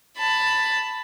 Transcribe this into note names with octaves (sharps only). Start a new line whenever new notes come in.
A5 B5